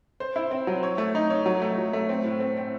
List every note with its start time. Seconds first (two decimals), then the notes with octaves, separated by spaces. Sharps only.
0.20 C5
0.36 E4
0.51 C4
0.67 F#3
0.83 C#5
0.98 A3
1.15 D#4
1.30 C#5
1.46 F#3
1.62 A3
1.78 F#3
1.93 A3
2.09 C4
2.25 A2
2.40 C4
2.57 C4